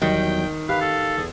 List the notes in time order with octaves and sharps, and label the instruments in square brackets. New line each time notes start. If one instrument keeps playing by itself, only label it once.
[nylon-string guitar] E2 F#3 G3 [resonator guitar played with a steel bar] D#3 [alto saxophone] G5
[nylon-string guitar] G4 [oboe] B4 [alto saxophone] F5
[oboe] A4
[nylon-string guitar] E2 B3 [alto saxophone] G#4